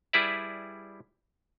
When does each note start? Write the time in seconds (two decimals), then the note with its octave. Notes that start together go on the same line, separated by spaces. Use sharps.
0.13 G3 E4 G#4 B4 D5 E5